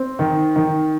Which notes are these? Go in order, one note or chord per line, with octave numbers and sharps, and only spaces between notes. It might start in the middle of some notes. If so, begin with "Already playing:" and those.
Already playing: C4
D#3
D#3